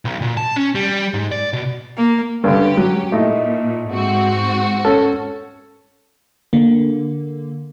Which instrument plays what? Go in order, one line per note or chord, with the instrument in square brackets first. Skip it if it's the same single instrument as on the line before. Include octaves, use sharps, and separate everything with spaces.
[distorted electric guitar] B1
A#2
A5
C#4
G3
G#2
D5
B2
[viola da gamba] A#3
[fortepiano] G2 D3 [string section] C#4 G4
[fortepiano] F#3
[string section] A#2 [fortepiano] A3 D#4 E4
[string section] G#2 C4 F#4
[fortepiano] C#4 A4
[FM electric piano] D3 A#3